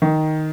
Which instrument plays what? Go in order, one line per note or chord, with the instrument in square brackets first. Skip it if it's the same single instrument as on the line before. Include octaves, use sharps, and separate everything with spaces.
[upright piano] D#3